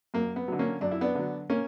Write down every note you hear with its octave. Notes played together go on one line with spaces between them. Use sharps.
F#2 A#3
B3
D3 F#3
A#3 C#4
F#2 D4
E4
B3 D4
D3 F#3
A#3 C#4